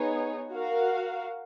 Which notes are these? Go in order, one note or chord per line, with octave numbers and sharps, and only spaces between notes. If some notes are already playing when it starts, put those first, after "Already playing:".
Already playing: B3 D#4 G#4 C#5
F#4 A#4 F5